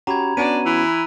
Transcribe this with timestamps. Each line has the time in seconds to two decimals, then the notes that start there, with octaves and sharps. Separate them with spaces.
0.07 C#4 F#4 G4 A#5 B5 G#6
0.37 B3 C#4 D4 F#4 D#7
0.65 E3